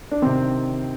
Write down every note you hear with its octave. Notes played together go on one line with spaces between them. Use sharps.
D4
C3 D#3 C4